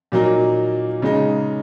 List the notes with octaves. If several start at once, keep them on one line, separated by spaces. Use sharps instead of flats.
A#2 F#3 A#3 D#4
C#3 G#3 D#4